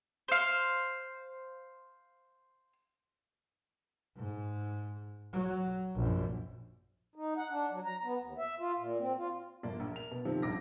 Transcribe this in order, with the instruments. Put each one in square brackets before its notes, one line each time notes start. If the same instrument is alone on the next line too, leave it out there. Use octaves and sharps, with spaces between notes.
[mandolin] C5 F5
[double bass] G#2
F#3
A#1 F#2
[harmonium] D#4
F#5
D4
F#3
A#5
B3
D#2
E5
F4
A#2
C4
F4
[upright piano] G1 A#2 F3 A#3 D4 D5
A#1
A#4 F7
B2
C3 D#3 F3 C4
D#1 A#1 D6 A#6